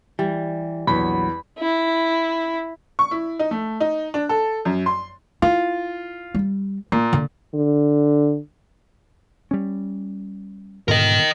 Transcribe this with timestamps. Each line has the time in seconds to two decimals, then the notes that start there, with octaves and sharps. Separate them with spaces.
0.19 E3 G3
0.87 A#1 E2 F#3 B5
1.59 E4
2.99 C#6
3.11 E4
3.39 D#4
3.51 A3
3.80 D#4
4.14 D4
4.29 A4
4.65 F#2
4.86 C6
5.42 E4 F4
6.34 G3
6.92 A#2 A#3
7.13 D3
7.54 D3
9.51 G3 C#4
10.88 D#1 G#2 B2 D3 A#4 D#5